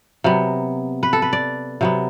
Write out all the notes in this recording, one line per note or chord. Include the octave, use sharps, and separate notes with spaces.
C3 F#3 B3
B4
A4
B4
D5
C3 F#3 B3